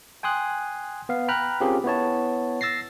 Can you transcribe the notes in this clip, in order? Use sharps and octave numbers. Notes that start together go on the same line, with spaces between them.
G5 G#5 C6 D#6 F#6
B3 F5
G5 A#5 B5 F6 F#6
C4 C#4 F4 G4 G#4 A#4
B3 E4 C#5 A5
E6 A6 A#6 C7